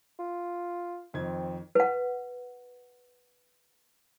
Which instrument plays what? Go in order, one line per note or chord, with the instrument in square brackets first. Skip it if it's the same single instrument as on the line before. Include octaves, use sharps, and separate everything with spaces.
[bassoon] F4
[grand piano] F2 D#3 G#6 [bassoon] C4
[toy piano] B4 F#5